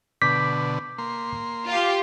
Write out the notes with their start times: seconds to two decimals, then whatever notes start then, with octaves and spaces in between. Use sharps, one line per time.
0.22 B2 D3 D6 G6 B6
0.98 A#3 C6
1.68 F4 G4